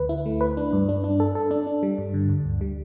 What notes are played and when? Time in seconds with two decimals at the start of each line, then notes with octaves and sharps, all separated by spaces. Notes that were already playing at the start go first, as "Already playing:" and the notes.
Already playing: D2 B4
0.09 E4
0.26 A3
0.41 B4
0.57 D4
0.73 G2
0.89 D4
1.04 D4
1.20 A4
1.35 A4
1.51 D4
1.67 D4
1.83 G3
1.98 G2
2.14 D3
2.29 G2
2.45 D2
2.61 G3